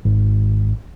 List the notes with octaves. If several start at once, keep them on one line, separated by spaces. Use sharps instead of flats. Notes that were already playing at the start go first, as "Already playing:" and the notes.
G#1